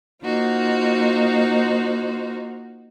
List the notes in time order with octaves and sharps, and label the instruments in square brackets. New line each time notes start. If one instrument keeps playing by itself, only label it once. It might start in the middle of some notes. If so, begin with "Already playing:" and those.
[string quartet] A#3 D#4 F4 F#4 C5